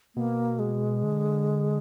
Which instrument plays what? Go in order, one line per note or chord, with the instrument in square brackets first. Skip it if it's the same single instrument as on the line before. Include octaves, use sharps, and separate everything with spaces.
[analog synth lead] B2 [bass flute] A#3
[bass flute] G#3
[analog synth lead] D3